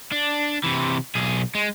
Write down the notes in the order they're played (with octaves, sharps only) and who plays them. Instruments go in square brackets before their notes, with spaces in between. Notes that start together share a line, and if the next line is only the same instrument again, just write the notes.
[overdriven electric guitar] D4
C3 E3
B1 G#4
G#3